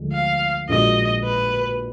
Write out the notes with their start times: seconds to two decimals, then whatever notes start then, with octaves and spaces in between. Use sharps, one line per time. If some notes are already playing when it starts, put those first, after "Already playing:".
Already playing: D2 D3 F3 G#3
0.13 F5
0.69 A#1 A#2 G#3 D4 F#4 D#5
1.24 B4